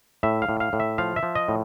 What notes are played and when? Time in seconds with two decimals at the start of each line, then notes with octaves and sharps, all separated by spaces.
0.23 A2 E5
0.42 F5
0.49 A2
0.60 F5
0.73 A2
0.80 E5
0.98 F3 F5
1.16 E5
1.23 F3
1.35 D#5
1.48 A2